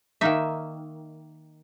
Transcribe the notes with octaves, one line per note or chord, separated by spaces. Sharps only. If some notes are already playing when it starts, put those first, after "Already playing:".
D#3 A#3 D#4 E5